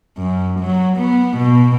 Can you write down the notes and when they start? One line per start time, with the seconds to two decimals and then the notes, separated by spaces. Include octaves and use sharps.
0.18 F#2
0.60 F#3
0.98 B3
1.38 B2